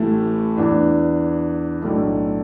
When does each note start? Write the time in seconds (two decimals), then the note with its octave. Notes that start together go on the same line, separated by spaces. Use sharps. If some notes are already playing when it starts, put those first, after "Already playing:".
Already playing: A1 A2 E3 A3
0.57 E2 E3 D4
1.81 B1 A2 A3 D4